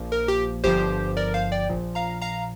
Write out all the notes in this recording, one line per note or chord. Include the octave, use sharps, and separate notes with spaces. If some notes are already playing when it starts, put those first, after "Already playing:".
Already playing: A#1 A#2 F3 A#3
A#4
G4
G1 G2 F3 G4 C5
A#4 D5
C5 F5
D5 G5
A#1 A#2 F3
F5 A#5
F5 A#5